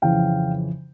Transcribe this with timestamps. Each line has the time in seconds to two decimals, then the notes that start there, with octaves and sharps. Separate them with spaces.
0.02 F2 C#3 E3 F5 G5